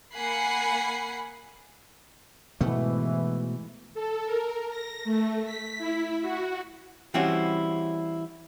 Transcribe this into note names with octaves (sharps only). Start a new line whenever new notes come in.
A#3 F#5 G#5 B5 C7
G#2 B2 E3 A3
A4
A#4
A#6
A3
B6
E4
F#4
E3 G3 C4 C#4 E4 F#4